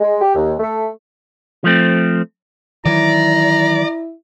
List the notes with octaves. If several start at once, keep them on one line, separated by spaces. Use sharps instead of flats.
G#3
G4
D#2
A3
F3 A3 C4
D#3 E3 F#3 E4 D5 A#5